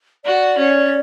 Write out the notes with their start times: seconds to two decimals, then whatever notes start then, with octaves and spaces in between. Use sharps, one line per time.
0.25 F#4 D5
0.58 C#4